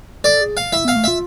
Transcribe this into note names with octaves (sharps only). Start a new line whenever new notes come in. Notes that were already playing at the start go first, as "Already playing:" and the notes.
A4 D5
G#4
F5
E4 E5
B3 F5
A3
F4 E5